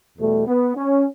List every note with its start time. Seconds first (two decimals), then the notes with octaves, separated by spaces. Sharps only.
0.18 E2 B2 G3 A3
0.47 B3
0.76 C#4